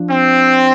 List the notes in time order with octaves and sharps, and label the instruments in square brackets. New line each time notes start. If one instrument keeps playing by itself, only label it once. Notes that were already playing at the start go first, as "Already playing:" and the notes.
Already playing: [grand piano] F3 D4
[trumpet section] C4